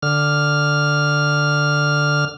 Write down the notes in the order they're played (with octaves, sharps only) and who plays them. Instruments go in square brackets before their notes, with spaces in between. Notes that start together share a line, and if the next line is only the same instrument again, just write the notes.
[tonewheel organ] D3 F6